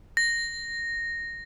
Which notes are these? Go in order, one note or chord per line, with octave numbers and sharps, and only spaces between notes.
A#6